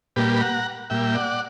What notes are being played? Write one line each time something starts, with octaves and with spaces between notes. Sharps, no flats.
A#2 G3 A#3 G4 B4
B5
F#5 A#5
A#2 G3 A#3 E5 G5
D5 F#5